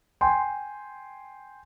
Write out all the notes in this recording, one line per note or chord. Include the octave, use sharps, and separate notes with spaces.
G5 G#5 C6